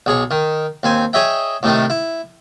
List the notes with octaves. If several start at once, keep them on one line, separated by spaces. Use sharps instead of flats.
B1 G#4 C#5
D#3
D#2 C4 G#5
G#4 C#5 D#5 E5 G5
A2 C3 D#3 A3
E4